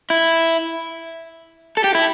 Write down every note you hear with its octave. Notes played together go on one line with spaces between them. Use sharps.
E4
A4
G4
E4